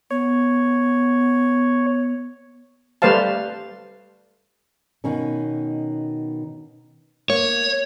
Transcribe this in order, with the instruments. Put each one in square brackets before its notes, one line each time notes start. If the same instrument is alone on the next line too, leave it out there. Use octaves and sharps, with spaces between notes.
[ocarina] B3 [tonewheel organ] C#5
[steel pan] G3 A3 B4 C5 F5 A5
[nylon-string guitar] B2 D#3 C#4
[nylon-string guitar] A#3 [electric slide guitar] C#5